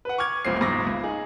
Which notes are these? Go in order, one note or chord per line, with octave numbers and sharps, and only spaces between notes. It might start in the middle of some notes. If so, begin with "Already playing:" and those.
B4 F#5
C#6 D6 F6 G#6
D#1 A1 C4 C7
F#1 G#2 C#6 D6 E6 A#6
C#2
D#4 G#4